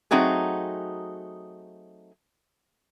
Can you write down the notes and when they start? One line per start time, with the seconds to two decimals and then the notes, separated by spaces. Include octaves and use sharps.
0.11 F#3 A3 C4 D#4 F#4 G#4